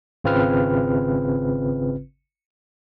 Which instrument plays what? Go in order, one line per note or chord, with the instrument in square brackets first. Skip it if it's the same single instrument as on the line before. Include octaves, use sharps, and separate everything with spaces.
[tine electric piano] G#1 C#3 C4 F4 B4 F6